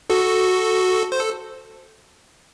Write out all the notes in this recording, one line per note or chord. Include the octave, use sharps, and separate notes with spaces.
F#4 A4
C5
A4